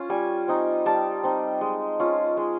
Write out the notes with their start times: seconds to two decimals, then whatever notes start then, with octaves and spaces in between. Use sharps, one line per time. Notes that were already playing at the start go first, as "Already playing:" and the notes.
Already playing: C#4 F4
0.09 G3 G#5
0.48 C4 D#4
0.86 G3 A5
1.24 C4 D#4
1.61 G#3
2.00 C#4 F4
2.37 G#3